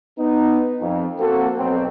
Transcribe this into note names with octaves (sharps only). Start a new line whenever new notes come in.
B3 D#4
F2
A#3 C4 F#4 A4
B1 C4